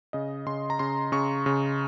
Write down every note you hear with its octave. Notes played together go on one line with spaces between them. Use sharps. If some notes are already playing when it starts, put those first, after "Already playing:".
C#3 D#5
C#3 C6
A#5
C#3 C6
C#3 C#6
C#3